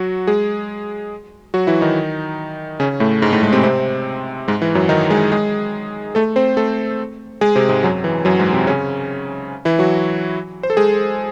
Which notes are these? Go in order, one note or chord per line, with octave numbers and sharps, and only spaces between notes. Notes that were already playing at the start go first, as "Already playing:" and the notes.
Already playing: F#3 F#4
G#3 G#4
F#3 F#4
E3 E4
D#3 D#4
C#3 C#4
A2 A3
G#2 G#3
A2 A3
G#2 G#3
C3 C4
C3 C4
G#2 G#3
E3
F#2 F#3
D#3 D#4
G#3 G#4
G#3 G#4
A3 A4
C4 C5
A3 A4
G#3 G#4
C3 C4
G#2 G#3
F#2 F#3
E3
F#2 F#3
G#2 G#3
C3 C4
C#3 C#4
E3 E4
F#3 F#4
C5
A4
G#3 G#4